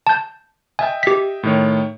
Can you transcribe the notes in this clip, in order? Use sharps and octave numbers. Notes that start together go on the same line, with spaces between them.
A5 G6
D#5 E5 G5 G#5
G4 B6
A2 D#3 C#5